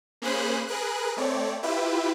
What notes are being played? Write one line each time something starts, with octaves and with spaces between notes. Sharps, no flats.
A#3 C#4 G#4 C5 B5 F#6
G#4 A#4 B4 F#6
A3 C4 C#5 D5
E4 F4 G4 B4 E5